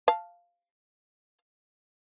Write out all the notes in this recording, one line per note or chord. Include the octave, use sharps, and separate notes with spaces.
F5 A5